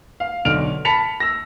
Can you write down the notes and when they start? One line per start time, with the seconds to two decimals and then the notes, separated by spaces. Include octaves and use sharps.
0.20 F5
0.45 B1 D3 F6 D7 F7
0.85 A5 B5 B6 C#7 F7
1.20 E6 A#6